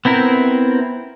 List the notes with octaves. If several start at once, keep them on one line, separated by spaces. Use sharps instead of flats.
B3 C4 E4 A#4